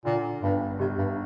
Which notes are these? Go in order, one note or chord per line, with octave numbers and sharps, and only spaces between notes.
A#2 D3
G1 G2
G1 C3
G2